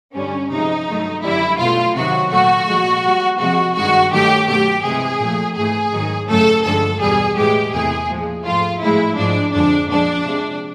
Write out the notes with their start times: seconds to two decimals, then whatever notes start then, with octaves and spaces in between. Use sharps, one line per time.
0.15 G2 D3 G3 C#4
0.52 C3 F3 G#3 D#4
0.88 G2 D#3 F#3 A3
1.24 F#2 D3 G3 E4
1.59 B2 F#3 A3 F4
1.96 C3 D#3 F#3 F#4
2.31 A#2 F#3 A3 F#4
2.68 A#2 F3 G#3
3.04 A#2 G3
3.40 C3 F3 G#3 F#4
3.76 G2 D#3 G#3 F#4
4.12 G2 D#3 F#3 A3 G4
4.48 B2 F#3 A3 G4
4.84 C3 E3 G#3 G#4
5.20 A#2 F3 A3
5.57 G#2 E3 A3 G#4
5.92 G#2 D#3 F#3
6.28 F#2 C#3 F#3 A3 A4
6.65 G2 D3 F3 G#3 A4
7.01 E2 B2 G3 G#4
7.37 A2 E3 G#3 G4
7.73 E2 C3 E3 A3 G#4
8.09 A#2 F3 G#3
8.45 G#2 F3 A3 F4
8.81 A2 F3 G#3 E4
9.17 G#2 F3 G#3 D4
9.53 F2 D3 F3 G#3 D4
9.89 A#2 F3 G#3 D4
10.25 C3 F3 G#3